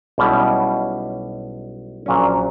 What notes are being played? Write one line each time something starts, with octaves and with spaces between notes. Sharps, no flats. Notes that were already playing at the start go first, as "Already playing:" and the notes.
B1 B2 G3 C#4 E4
A#1 A#2 F#3 C#4